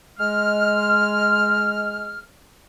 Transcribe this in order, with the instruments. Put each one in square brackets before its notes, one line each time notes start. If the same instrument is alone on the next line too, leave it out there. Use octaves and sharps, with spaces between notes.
[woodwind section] G#3 F6